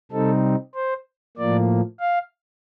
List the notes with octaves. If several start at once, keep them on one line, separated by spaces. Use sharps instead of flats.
C3 G3 C4 D#4 A4
C5
A2 F3 A#3 D5
F5